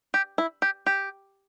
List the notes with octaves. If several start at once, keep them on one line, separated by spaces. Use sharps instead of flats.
G4
E4
G4
G4